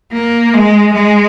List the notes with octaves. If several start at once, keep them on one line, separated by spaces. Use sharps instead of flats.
A#3
G#3
G#3